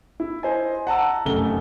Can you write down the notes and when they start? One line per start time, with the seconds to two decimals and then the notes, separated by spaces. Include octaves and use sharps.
0.20 E4
0.43 C5 D#5 G#5
0.87 F#5 A5 A#5 E6
1.25 F1 F#2 A3 G7